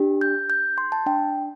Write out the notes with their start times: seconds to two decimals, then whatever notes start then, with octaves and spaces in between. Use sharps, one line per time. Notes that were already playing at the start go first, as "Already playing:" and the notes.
Already playing: D4 G4
0.21 G6
0.50 G6
0.78 C6
0.92 A5
1.06 D4 G5